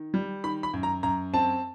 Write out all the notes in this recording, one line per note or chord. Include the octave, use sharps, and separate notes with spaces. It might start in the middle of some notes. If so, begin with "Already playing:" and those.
Already playing: D#3
G3
D#3 B5
B5
F#2
A#5
F#2 A#5
C4 A5